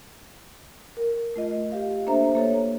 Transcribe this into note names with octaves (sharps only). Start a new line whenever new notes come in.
A#4
A3 F4 D#5
G4 F5
A#3 D4 A4 C5 E5 A#5
A#3 A4 C#5